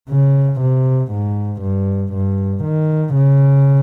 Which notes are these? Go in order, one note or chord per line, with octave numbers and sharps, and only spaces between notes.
C#3
C3
G#2
G2
G2
D#3
C#3